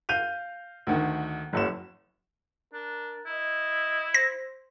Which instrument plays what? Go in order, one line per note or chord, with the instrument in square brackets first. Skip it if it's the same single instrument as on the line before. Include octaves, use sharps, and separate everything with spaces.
[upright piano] F5 G6 D#7 F7
D2 D3 D#3
F#1 F#2 E7
[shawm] D4 [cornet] A#4
[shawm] E4 [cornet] D#5
[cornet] C5 [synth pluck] A#6